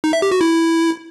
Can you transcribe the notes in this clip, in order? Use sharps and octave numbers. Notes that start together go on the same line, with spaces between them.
D#4
E5
G4
F#4
E4